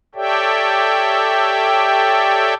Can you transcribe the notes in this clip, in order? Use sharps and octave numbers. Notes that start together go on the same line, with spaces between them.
G4 A4 C#5 D5 E5 G5